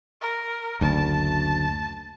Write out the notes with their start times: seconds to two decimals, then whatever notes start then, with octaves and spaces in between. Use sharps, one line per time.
0.21 A#4
0.81 F#1 D2 A5